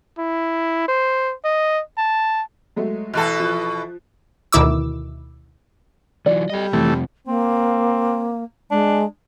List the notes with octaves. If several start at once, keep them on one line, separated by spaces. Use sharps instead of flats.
E4
C5
D#5
A5
F#3 G#3 A3
B2 E3 A4 A5 F#6
F3
D2 B2 D#3 E4 D6 E6
E3 F#3 D5
G3 A4 D#5
F2 C3 E3 A3
A#3 C4
G#3 D4